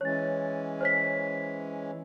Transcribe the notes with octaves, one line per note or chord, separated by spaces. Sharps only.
E3 G#3 C#4 C#5 A6
C5 C#5 B6